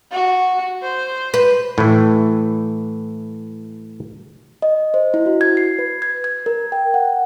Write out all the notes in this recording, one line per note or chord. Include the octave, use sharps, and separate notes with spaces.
F#4
C5
B4
A2 E3
D#5
C5
E4
F#4
G#6
C7
B4
G#6
G#6
A#4
G5
F#5